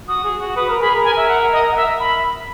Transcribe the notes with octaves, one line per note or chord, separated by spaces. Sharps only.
F#4 D#6
G#4
F#4
B4 D#6
A#4
G#4 B5
A#4
G#5
E5
F#5
D#5
F#5
E5
B5